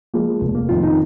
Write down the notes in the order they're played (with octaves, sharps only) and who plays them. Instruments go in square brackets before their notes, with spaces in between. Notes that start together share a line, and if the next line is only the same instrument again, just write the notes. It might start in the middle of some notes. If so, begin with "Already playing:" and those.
[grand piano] F3 G#3 [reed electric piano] A#3
[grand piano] F1
[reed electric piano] A#3
[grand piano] F2 D#3 [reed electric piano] F4
[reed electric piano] D#4